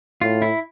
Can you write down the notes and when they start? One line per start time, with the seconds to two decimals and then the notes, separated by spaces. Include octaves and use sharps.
0.21 A2 F4
0.42 E4